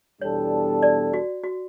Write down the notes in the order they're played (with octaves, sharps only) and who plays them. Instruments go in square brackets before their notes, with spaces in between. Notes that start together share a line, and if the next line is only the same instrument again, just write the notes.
[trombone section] E2 B2 G3 D4 A4 [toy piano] C#5
[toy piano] D5
F#4
F#4